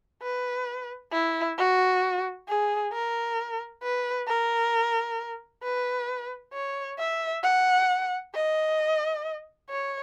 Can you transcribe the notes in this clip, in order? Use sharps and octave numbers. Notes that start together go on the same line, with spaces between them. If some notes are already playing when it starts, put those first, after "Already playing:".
B4
E4
F#4
G#4
A#4
B4
A#4
B4
C#5
E5
F#5
D#5
C#5